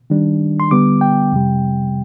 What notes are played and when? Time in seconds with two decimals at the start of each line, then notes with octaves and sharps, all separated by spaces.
0.10 D#3 G3 D4
0.60 C6
0.71 D3 G3 B3 D6
1.01 G5
1.32 F2 C3 G3